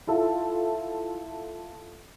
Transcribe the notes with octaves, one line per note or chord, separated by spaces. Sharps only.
E4 F4 A4